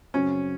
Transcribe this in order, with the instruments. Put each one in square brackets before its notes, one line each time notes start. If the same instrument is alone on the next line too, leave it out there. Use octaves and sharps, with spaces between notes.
[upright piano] F#2 C#3 F#3 C4 F#4 [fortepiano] C#4